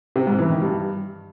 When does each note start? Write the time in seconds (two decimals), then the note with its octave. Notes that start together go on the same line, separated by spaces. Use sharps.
0.16 C3
0.27 G#2
0.39 E3
0.50 D#3
0.62 G2